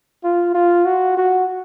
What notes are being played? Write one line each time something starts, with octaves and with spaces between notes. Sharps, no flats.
F4
F4
F#4
F#4